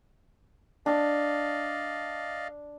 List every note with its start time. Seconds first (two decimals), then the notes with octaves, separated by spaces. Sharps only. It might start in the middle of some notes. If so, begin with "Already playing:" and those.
0.86 D4 D5 D#5 F5